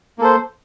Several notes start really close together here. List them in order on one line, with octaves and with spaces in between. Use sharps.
A#3 A4 C5